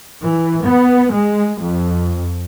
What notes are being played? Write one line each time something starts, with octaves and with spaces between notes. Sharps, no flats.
E3
B3
G#3
F2